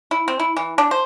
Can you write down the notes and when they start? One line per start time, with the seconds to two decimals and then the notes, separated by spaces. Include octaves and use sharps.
0.11 E4
0.28 C4
0.40 E4
0.57 E3
0.78 D4
0.91 C5